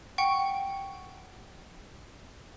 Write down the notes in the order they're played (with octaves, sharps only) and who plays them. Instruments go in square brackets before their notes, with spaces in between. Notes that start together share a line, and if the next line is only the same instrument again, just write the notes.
[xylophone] F#5 G5 C#6